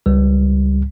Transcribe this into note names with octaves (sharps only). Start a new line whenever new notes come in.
C#2 G3